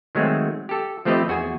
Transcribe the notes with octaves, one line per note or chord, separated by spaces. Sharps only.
D#3 F#3 G#3 A3 C4
G4 A4
F3 A3 C4 G4 B4 D#5
E2 F#4 G#4 G#5